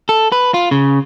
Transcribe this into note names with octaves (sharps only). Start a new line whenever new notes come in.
A4
B4
F4
C#3